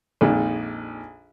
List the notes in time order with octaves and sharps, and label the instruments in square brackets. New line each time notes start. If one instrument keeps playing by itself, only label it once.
[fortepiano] A#1 F2 A#2 D#3 G#3 D#4